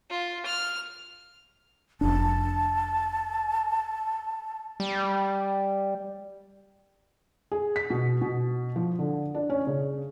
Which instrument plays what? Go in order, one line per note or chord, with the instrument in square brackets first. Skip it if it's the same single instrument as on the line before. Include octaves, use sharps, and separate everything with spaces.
[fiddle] F4
F6
[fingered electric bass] F1 D4 [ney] A5
[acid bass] G3
[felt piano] G#4
B6
B2
B2
F3
D3
D4
C#4
C#3